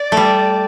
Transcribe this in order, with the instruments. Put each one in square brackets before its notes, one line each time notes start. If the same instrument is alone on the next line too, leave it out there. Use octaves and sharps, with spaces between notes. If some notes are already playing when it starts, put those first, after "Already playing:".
Already playing: [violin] D5
[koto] A3
G3